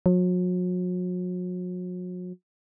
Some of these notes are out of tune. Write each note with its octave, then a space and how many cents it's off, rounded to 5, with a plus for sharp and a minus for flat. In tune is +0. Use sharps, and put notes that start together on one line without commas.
F#3 -40